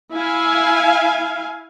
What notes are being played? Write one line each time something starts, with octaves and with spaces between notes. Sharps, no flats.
E4 F5 G#5